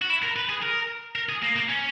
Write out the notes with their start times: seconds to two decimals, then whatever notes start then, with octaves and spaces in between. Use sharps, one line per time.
0.01 F#4
0.09 E4
0.23 A#4
0.36 B4
0.49 G#4
0.63 A#4
1.15 A#4
1.29 G#4
1.42 A#3
1.55 A#3
1.69 C#4